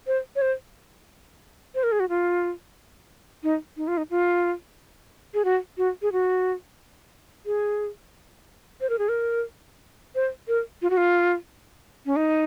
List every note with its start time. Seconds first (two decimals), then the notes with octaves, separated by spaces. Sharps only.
0.07 C5
0.36 C#5
0.42 C5
1.75 C5
1.83 A#4
1.92 G#4
2.00 F#4
2.09 F4
3.43 D#4
3.77 D#4
3.88 F4
3.97 D#4
4.11 F4
5.34 G#4
5.45 F#4
5.78 F#4
6.02 G#4
6.12 F#4
7.46 G#4
8.81 C5
8.90 A#4
8.99 G#4
9.09 A#4
10.15 C5
10.48 A#4
10.82 F4
10.90 F#4
10.97 F4
12.06 C#4
12.16 D#4